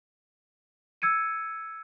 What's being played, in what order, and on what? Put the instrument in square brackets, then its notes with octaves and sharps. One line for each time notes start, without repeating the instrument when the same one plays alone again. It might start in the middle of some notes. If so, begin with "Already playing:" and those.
[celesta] E6 G#6 C#7 D#7